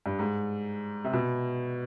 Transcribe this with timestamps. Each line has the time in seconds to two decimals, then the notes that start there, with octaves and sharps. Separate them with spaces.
0.06 G2
0.19 G#2
1.04 C3
1.13 B2